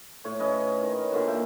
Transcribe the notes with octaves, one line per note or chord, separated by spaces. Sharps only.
A2 C#5
C#4 B4 D#5
D#3
A#2 D3 A#3 F#4
E5 G5